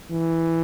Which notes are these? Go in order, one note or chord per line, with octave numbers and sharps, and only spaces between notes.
E3